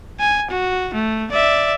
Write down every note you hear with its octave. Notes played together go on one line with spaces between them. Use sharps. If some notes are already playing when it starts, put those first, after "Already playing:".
G#5
F#4
A3
D5 E5